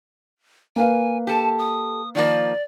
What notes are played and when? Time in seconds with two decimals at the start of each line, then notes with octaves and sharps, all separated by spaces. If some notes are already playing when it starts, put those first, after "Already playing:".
0.76 A#3 B4 F5 G#5
1.27 G4 A4 A5
1.59 D#6
2.15 D#3 F3 A#3 D5